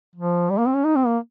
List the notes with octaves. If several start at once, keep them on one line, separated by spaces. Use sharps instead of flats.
F3
G3
A#3
C4
C#4
D#4
C4
A#3